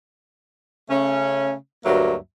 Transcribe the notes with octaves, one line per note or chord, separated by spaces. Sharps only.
C#3 A3 C#4
D2 G2 F#3 A#3 E5